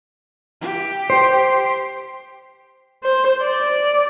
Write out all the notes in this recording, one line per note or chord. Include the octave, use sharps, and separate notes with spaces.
G4
C5
C5
D5